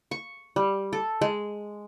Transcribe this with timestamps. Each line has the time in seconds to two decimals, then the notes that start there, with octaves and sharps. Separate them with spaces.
0.11 C#6
0.56 G3
0.93 A4
1.21 G#3